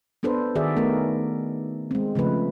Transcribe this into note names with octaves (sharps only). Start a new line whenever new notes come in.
B3 D4 A4 B4 C5
D#3 F#4 G#4 D5 E5
A3 B3 D#4 A#4
G#3 C4
C#3 F3 A3 B4